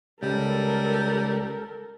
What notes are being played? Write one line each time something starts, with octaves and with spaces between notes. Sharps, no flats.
C#2 G3 A4 A#4